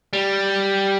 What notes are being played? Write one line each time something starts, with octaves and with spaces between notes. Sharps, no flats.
G3